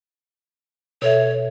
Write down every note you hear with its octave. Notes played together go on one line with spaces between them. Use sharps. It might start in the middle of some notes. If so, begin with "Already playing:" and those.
B2 A4 C#5 E5